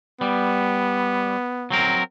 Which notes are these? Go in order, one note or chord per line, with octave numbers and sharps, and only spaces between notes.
G3 B3
F#3 C4 A#4